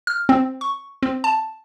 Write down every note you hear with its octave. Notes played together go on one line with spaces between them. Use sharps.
F6
C4
C#6
C4
A5